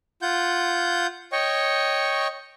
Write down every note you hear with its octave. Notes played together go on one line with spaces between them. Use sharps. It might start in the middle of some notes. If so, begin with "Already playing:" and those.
F4 F#5 G6
C#5 D#5 G5 C#6